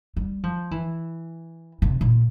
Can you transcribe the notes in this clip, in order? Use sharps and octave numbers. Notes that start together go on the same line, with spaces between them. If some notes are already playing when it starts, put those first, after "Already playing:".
G3
F3
E3
C3
A#2